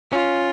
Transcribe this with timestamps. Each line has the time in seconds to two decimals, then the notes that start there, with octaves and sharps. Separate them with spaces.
0.12 C#4 F4